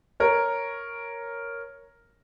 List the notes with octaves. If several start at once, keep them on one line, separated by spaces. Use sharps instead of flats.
A#4 C#5